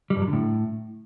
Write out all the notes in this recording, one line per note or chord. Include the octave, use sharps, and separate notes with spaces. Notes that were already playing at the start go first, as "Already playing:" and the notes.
G3
G2
F#3
D3
A2